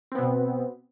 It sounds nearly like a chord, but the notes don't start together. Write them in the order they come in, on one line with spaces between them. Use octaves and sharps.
C4 B3 B2